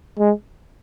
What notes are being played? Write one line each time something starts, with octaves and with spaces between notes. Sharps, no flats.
G#3